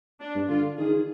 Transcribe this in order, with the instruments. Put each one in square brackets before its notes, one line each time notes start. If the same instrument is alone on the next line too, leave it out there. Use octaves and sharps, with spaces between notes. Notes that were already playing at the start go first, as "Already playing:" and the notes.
[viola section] D4
[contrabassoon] G2
[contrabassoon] D3 [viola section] F4
[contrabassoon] D#3 [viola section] G#4
[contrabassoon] D#3